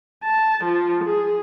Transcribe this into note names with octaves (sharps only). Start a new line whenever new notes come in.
A5
F3
G#4